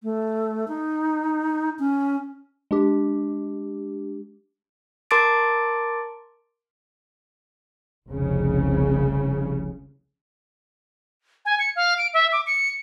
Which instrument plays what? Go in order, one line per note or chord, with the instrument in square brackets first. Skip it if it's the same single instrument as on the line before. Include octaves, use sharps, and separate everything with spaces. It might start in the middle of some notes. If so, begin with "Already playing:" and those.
[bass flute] A3
D#4
C#4
[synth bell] G#3 D4 G4
[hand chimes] A#4 A5 C6 D6 A6 D7
[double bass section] F1 C2 C#3
[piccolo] G#5
C#7
F5
D7
E5
D6
C#7